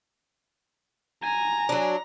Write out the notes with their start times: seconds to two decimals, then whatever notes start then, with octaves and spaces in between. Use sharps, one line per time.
1.24 G#5 A#5
1.69 F#3 D4